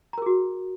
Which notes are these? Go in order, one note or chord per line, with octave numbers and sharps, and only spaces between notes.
F#4 G#4 A#4 A#5